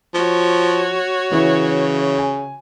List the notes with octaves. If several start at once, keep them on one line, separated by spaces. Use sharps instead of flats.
F3 F#4 C#5
C#3 E3 E4
G#5